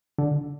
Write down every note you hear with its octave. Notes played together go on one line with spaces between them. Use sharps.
D3